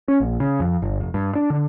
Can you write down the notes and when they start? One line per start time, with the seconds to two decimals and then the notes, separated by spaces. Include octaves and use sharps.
0.08 C#4
0.20 A#1
0.40 C#3
0.60 F2
0.82 G1
1.00 F1
1.14 G2
1.35 D4
1.50 D3